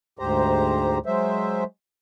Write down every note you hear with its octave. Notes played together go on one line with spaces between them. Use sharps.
D2 G#2 G4 C5 A#5
F#3 G#3 C5 E5